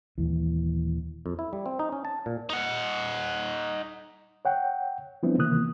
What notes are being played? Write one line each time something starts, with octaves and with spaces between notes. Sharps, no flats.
D#1 D#2 E3
F2
E4
G3
C4
D#4
C#4
A5
A#2
D#4 F#5
C#5 F#5 G5
F3 G3 B3 C4 D4 E4
C3 D#3 E3 A#3 D#6 F#6